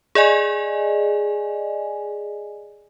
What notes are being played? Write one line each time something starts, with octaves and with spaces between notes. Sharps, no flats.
G#4 D5 D#5 G#5